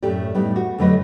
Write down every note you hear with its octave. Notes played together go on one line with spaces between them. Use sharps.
F#2 A2 A3 G4 D5
A2 G3 B3 D#4
F#4
F2 D3 F#3 A3 B4 D#5